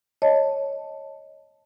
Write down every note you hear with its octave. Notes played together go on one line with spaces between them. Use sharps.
C#5 D#5 A5